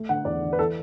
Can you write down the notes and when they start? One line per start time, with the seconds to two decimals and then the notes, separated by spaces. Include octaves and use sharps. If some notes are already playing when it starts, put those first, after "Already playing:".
Already playing: A3
0.09 D3 F#5
0.25 E2 D5
0.43 D3
0.53 B4
0.58 E3 A4